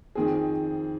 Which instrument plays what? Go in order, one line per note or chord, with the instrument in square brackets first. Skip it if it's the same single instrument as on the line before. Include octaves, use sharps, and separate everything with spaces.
[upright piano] F2 D#3 C4 G#4